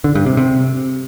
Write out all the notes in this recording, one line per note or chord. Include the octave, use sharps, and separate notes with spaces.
D3
G2
C3
C3